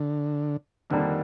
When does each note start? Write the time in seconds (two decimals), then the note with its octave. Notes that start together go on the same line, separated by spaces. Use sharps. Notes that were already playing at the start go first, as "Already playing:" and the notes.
Already playing: D3
0.90 F2 D3 D#3 G3 A#3 D4